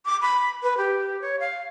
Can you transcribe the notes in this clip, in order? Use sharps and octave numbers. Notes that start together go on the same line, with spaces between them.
D6
B5
B4
G4
C#5
F5